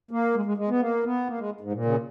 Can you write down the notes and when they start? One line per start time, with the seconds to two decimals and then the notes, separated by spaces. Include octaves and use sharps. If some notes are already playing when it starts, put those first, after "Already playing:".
0.11 A#3
0.35 G#3
0.45 G#3
0.57 G#3
0.69 B3
0.80 A#3
1.04 B3
1.27 A#3
1.38 G#3
1.61 G#2
1.72 A#2
1.85 C#3